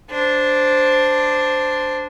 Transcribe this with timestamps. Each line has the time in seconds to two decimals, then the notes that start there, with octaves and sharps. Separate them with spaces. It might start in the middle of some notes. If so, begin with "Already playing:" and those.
0.11 D4 C5